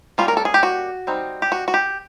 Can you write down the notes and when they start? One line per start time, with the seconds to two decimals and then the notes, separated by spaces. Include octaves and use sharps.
0.18 G3 A#3 C#4 F4
0.28 A#4
0.37 A4
0.45 G#4
0.54 G4
0.63 F#4
1.07 G3 C4 D#4
1.42 G4
1.52 F#4
1.68 F#4
1.74 G4